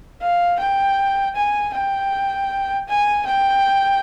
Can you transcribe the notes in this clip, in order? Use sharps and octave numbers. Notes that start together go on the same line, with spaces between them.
F5
G5
G#5
G5
G#5
G5